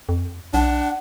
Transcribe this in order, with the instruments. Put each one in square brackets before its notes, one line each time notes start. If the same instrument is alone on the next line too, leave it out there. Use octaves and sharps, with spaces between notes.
[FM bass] F2
[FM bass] B1 [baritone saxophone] D4 [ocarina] F#5